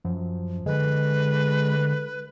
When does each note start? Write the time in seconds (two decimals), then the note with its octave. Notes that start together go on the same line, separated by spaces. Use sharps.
0.04 F#2 F3
0.66 D3 G#3 B4